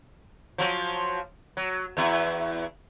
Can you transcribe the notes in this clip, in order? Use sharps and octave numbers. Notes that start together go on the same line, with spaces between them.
F3 F#3
F#3
E2 E4